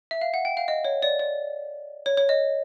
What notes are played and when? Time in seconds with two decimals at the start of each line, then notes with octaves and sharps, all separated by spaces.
0.11 E5
0.21 F5
0.34 F#5
0.45 G5
0.57 F5
0.68 D#5
0.85 C#5
1.02 D5
1.19 D5
2.06 C#5
2.17 C#5
2.29 D#5